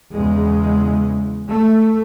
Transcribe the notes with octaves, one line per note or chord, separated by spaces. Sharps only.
E2 C#3 G#3
A3